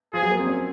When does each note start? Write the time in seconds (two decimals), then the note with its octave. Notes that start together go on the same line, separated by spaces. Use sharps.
0.13 F3 G#4
0.22 F#3
0.31 A#3
0.39 C4
0.47 C#4